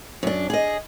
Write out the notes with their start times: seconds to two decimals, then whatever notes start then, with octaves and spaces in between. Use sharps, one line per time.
0.23 F#2 D4
0.50 G#4 D#5